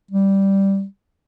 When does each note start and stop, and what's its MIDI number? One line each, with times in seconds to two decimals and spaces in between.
0.11 0.85 55